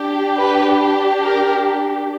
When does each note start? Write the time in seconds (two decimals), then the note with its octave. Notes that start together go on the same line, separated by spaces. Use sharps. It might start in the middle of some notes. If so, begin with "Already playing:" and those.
Already playing: D4 G4
0.38 B4
1.24 A#4